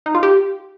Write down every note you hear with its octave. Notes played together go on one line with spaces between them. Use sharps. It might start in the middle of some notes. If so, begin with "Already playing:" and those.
D#4
F4
G4